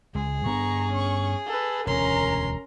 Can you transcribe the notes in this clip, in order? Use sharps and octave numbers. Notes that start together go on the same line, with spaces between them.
C#2 G#3 G#4
G2 B3 D4 A#5 C#6
C#4 C#6
A4 B4
E1 D2 C#4 A#4 A#5 C6